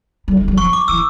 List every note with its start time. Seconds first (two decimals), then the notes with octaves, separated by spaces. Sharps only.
0.28 G3
0.37 A3
0.48 G3
0.57 F3 C#6
0.73 D6
0.88 E3 E6